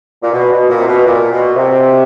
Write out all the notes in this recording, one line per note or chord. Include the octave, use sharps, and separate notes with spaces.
A#2
B2
B2
A#2
C3
B2
A#2
B2
C3